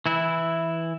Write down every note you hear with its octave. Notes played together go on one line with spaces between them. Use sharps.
E3 E4